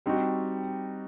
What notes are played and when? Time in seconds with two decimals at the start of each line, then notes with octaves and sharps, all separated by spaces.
0.06 G3 C4 D#4 F#4